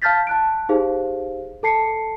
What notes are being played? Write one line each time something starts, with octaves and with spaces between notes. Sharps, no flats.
F5 A5 F6 G6 A6 B6
A5 F#6 D7
D#4 G4 G#4 C5 F5
A4 A5 C7 C#7